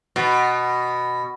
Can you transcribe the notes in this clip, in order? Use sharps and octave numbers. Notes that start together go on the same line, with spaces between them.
B2